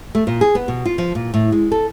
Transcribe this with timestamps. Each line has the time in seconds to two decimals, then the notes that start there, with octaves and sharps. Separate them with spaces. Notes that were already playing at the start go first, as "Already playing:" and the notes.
0.15 A3
0.27 A#2
0.41 G#4
0.55 B3
0.68 B2
0.86 F4
0.98 F3
1.15 A#2
1.34 A2
1.52 G#3
1.72 A4